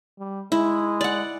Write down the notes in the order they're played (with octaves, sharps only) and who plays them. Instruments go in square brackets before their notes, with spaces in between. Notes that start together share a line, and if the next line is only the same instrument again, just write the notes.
[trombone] G3
[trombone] G#3 [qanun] E4
[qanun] D5 F#5